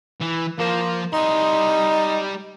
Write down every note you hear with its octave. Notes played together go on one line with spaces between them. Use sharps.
E3
F3 A#3 C5
G3 D#4 C6